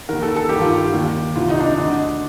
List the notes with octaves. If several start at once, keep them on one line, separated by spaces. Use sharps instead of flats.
D#2 D#3 A#4
A4
A4
G2 D#3 G4
F4
G4
D#2 D#3
C2 C3 D#3 F4
D#4
D4
D#4
D2 D3 D4